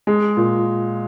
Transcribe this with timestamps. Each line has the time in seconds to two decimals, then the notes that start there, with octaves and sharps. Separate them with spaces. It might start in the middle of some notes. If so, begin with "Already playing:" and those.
0.07 G#3
0.37 A#2